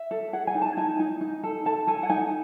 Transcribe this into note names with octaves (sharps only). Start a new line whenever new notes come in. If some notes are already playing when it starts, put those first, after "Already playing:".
Already playing: E5
A4
G#4 F#5
G#5
D#4
A5
D#4 G#5
D#4 G#5
D#4
A4
A4 A5
A4 G#5
F#5
D#4 G#5